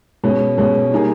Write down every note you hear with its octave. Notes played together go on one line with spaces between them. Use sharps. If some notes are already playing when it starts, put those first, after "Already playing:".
B2 G#3 C#4
B2 G#3 C#4
G3 A#3 D#4 G#4